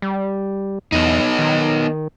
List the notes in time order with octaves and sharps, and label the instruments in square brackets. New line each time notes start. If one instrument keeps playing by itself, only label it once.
[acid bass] G3
[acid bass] E2 [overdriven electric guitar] B3 D#4
[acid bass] D#3